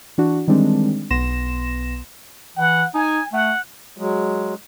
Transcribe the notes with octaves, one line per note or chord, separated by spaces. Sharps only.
E3 D4 F#4
D#3 E3 G3 G#3 C4 D4
B1 B3 C6 A#6 E7
E3 F#5
D#4 G#5
A3 F#5
F#3 G#3